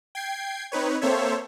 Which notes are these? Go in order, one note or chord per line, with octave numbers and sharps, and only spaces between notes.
G5 G#6 C7
C4 D#4 B4 C#5
A#3 C4 A4 C5 C#5 E5